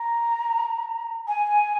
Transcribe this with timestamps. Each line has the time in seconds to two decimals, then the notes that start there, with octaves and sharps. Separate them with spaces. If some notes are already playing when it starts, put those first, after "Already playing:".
Already playing: A#5
1.28 G#5